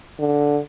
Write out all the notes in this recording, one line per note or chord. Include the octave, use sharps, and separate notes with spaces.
D3